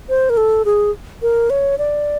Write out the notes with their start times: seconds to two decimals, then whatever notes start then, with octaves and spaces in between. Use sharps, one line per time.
0.09 C5
0.30 A#4
0.37 A4
0.65 G#4
1.22 A#4
1.50 C#5
1.78 D5